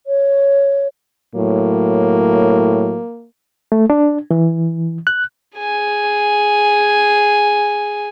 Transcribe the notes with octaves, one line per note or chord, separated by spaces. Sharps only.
C#5
A2 F#3 A#3
A3
D4
E3
F#6
G#4 G#5